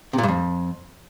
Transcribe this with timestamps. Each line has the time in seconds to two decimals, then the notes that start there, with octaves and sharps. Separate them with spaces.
0.13 C3
0.18 A#2
0.23 G2
0.28 F2